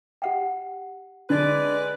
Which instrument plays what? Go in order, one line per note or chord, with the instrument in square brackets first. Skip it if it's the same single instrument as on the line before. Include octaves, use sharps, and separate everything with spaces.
[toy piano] G4 F#5 G5
[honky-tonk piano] D3 [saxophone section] G#3 B4 D5